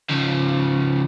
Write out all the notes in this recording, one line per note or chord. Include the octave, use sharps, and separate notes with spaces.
C#3 F3